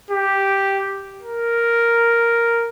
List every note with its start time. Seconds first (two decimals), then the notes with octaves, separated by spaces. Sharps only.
0.11 G4
1.23 A#4